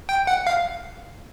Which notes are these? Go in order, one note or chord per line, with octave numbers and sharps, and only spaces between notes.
G5
F#5
F5